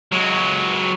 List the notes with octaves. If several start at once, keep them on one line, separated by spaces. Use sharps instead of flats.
F#3 G#3